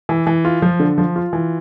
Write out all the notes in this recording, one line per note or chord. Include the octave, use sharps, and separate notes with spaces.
E3
E3
F4
F3
D3
F3
F4
E3